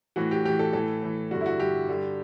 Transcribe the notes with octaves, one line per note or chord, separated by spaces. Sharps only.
A2 E3 F#4
G4
A2 E3 G4
A4
A2 E3 A4
A2 E3
G2 D3 F#4
E4
F#4
G2 D3 G4
G2 D3